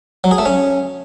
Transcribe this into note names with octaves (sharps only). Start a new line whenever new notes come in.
F#3
G#4
A3
C#4